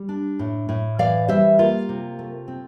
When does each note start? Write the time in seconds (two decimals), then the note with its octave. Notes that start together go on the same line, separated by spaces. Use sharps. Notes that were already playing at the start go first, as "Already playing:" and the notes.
Already playing: G3
0.09 D4
0.39 A2
0.69 A2
0.98 E3 D5 F5
1.28 G3 C5 E5
1.58 A#3 F4
1.89 C3
2.19 A3
2.48 C4